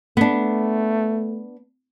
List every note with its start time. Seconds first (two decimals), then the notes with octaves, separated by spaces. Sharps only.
0.17 A3 B3 D4